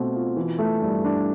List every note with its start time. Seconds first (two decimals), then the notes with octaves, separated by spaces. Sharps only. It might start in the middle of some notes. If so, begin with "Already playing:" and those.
Already playing: B2 A3 C4
0.14 F4
0.37 E3
0.59 A3
0.81 G2
1.04 D4